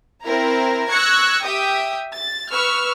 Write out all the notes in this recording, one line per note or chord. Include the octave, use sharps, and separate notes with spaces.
C4 E4 A#4 A#5
C#6 E6 F#6 G#6 A#6 C#7
G4 E5 G5 D#6
A6
B4 C#6 E6 F6